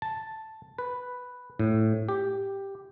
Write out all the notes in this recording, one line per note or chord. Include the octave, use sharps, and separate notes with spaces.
A5
B4
A2
G4